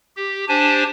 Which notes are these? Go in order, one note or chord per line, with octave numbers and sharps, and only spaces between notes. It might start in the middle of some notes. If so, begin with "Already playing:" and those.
G4
D4 G4 C5 G#5 A5